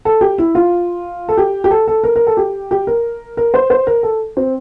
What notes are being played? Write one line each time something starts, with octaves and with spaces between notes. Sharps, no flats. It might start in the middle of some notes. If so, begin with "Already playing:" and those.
A4
G4
E4
F4
A4
G4
G4
A4
A4
A#4
A#4
A4
G4
G4
A#4
A#4
C5
C5
A#4
A4
C4